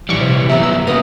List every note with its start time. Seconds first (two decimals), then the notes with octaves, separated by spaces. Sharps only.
0.09 A#1 E3 G3 C#6 D6
0.21 C3
0.49 F#2 B3 E5 A#5
0.63 E6
0.87 B1 C#3 A#3 B3 D#6